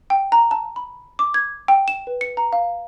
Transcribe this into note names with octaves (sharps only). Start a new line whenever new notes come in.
G5
A#5
A5
B5
D6
G#6
G5
E7
B4
C#7
A#5
F5